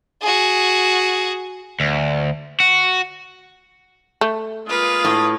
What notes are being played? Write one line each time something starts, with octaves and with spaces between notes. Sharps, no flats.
F#4 G#4
D2
F#4
A3
G#3 A#3 F4 B4 F5 D#6
A2